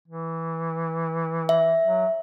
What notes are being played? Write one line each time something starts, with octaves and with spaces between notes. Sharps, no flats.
E3
E5
F#3